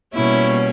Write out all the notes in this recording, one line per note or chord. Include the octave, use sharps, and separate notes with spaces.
B2 G3 A#3 C#4 E4